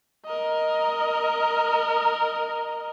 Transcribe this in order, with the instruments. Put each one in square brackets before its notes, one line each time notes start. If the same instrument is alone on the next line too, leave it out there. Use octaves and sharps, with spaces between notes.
[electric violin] A#4 D#5